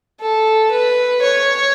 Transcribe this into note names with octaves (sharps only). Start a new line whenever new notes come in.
A4
B4
C#5